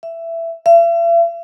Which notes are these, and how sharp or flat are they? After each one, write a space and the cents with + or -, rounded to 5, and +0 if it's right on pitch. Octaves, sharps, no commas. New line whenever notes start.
E5 +15
E5 +45